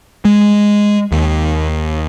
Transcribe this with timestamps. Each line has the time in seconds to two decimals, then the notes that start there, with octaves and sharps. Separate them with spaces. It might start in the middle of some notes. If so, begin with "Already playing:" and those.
0.25 G#3
1.12 D#2